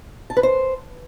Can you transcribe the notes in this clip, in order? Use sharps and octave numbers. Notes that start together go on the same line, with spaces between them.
A5
B4
C5